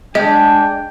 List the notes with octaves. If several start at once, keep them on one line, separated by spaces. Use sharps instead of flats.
G#3 D4 D#5 G5